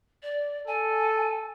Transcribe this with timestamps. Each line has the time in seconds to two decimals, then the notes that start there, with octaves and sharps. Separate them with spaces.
0.23 D5
0.67 A4 G#5